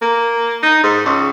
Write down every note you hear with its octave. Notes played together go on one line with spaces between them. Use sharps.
A#3
D#4
G#2
C#2